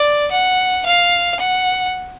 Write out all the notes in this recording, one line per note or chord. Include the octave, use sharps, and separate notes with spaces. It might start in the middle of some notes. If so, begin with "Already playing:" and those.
Already playing: D5
F#5
F5
F#5